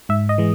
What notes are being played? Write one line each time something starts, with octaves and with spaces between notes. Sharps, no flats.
G#2 E5
D#5
E3 G#3